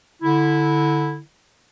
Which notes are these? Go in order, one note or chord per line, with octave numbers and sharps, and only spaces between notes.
D3 E4